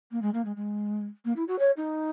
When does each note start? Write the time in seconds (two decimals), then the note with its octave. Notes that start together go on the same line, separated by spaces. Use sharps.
0.11 A#3
0.22 G#3
0.34 A#3
0.45 G#3
0.56 G#3
1.25 A#3
1.36 E4
1.48 F#4
1.59 C#5
1.76 D#4